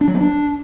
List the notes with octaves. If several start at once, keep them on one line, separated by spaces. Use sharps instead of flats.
D4
F#3
B3
D4